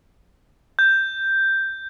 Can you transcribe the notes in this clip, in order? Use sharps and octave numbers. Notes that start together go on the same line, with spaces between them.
G6